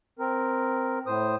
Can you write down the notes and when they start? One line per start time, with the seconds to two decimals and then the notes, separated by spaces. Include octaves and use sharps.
0.19 C4 A#4
1.07 A2 C5 D#6